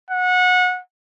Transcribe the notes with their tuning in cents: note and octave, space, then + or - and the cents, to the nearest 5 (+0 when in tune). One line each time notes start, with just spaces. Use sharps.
F#5 -25